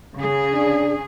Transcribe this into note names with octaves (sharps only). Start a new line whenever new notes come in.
C#3 G#4
D4